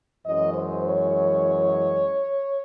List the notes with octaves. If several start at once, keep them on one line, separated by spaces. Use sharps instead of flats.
F#2 E3 G#3 D#5
C5
C#5